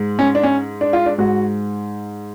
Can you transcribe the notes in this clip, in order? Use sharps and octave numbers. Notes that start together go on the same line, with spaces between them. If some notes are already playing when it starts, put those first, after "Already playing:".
Already playing: G#2
C#4
D4
C#4
D4
F4
D4
G#2 F#4